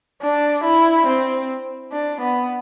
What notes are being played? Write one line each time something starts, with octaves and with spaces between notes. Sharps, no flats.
D4
E4
C4
D4
B3